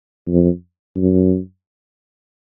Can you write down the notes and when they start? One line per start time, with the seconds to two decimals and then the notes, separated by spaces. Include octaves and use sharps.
0.28 F2
0.96 F#2